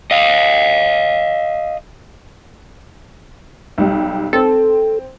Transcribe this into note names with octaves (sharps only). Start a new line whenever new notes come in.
D#5 F5
B1 G3
C4 A4